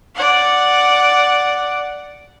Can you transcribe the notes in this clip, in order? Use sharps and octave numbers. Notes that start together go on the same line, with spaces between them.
D5 F#5